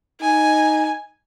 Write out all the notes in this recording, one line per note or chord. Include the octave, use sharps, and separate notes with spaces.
D#4 G#5